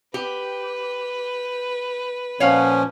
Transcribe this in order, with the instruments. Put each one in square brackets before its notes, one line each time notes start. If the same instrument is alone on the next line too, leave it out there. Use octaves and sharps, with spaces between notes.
[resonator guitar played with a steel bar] G4 [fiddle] B4
[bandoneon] A#2 F3 C#4 [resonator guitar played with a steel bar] C#5 F5 F#5